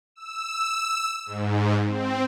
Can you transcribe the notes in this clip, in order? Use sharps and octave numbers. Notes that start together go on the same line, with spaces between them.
E6
G#2
C4